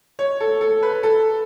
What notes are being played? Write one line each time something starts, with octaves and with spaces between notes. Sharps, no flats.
C#5
A4
A4
B4
A4